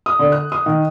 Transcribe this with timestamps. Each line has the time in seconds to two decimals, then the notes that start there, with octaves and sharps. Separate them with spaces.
0.06 D#6
0.19 D3
0.32 F#6
0.52 D#6
0.66 D#3